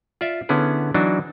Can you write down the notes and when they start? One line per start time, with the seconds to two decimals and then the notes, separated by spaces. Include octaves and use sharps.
0.21 F4 D5 E5
0.49 D3 B3 C#4 E4 G#4
0.94 E3 F#3 D4 D#4 F#4